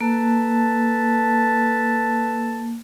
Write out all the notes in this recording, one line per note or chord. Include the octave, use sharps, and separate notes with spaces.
A#3 A4 B4 A5